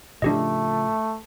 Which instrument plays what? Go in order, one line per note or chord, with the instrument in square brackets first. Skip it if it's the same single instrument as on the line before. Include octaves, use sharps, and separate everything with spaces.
[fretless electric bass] A2 C#3 F3 [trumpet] A3 [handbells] D4 G4 D#5